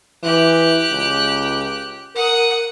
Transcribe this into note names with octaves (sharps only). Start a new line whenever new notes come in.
E3 G4 F#6
C#2
A#4 F#5 D#6